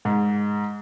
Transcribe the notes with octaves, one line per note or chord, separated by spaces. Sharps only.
G#2